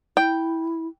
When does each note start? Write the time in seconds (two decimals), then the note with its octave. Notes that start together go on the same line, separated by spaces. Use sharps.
0.17 E4 G5